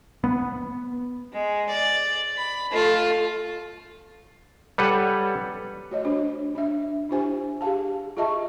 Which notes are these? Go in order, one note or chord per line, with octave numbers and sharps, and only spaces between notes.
B3
G#3
D5
B5
A3 F4
G3 A4 B4 C#5 F#5
A3 F#4 C#5 D#5
D4 F#4 C5
D4 E5
D4 E4 F4 G4 C5 G#5
G4 G#4 F5 A5
F4 G#4 D#5 E5 A5 C#6